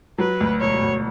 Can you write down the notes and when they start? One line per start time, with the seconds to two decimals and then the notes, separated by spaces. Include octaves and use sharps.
0.18 F#3 B4
0.41 D2
0.61 E1 C#5
0.82 D2